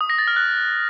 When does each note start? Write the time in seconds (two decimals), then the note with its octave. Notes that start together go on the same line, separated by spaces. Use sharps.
0.01 D#6
0.10 A#6
0.18 A6
0.27 F6
0.36 F#6